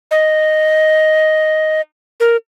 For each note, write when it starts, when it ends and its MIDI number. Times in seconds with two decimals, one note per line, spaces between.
0.11 1.81 75
2.20 2.37 70